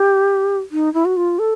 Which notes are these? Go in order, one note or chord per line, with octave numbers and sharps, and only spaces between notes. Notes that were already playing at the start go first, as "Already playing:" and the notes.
Already playing: G4
D#4
E4
F#4
F4
A4